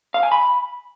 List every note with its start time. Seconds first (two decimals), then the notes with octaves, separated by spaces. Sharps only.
0.14 F5
0.23 G#5
0.32 B5